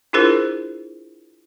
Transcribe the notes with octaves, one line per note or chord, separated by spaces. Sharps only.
D4 E4 F4 G#4 A#4 C5